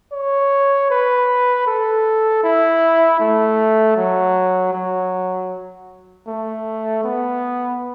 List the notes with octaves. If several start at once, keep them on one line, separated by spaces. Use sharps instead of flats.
C#5
B4
A4
E4
A3
F#3
F#3
A3
B3